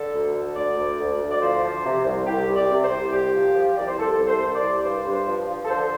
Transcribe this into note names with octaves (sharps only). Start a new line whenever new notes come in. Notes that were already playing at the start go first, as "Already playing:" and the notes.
Already playing: D3 A4
D2
D3
D2 D5
D2
D2
D2
D5
F3 C5
F3
C3
C2
C2 G4
C2
D5
C3
C5
C2
C2 G4
F3
F3
C2 D5
C5
C2 A4
C2
C5
C2
D5
C2
G2 C5
G2
C5
F3
F3
A4
D3 C5